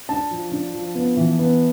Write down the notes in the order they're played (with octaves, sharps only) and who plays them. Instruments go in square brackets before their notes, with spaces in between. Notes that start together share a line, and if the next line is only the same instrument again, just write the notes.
[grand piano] D4 A5
F3
D4
F3
B3
E3
B3